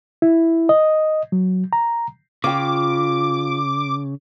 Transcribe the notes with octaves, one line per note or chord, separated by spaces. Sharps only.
E4
D#5
F#3
A#5
C#3 F4 G5 D6